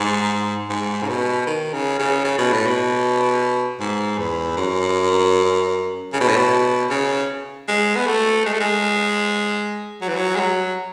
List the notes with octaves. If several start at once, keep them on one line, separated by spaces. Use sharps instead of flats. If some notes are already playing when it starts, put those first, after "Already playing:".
Already playing: G#2
G#2
C#3
B2
D#3
C#3
C#3
C#3
B2
A2
B2
G#2
E2
F#2
C#3
B2
A2
B2
C#3
G#3
B3
A3
G#3
A3
G#3
F#3
E3
F#3
G#3
F#3